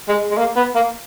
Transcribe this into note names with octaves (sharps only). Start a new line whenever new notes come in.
G#3
G#3
A#3
B3
A#3